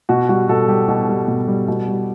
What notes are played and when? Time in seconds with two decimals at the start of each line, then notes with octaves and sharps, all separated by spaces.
0.09 B2 F#4
0.29 G3 F#4
0.49 B2 A4
0.68 G3 G4
0.88 B2
1.09 G3
1.28 B2
1.48 G3
1.68 B2
1.88 G3